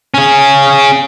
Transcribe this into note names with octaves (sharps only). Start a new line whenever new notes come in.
C#4 G#4